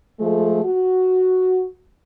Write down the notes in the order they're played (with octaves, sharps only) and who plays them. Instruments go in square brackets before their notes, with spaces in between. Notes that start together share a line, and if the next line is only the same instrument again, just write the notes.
[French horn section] F3 G#3 A3
F#4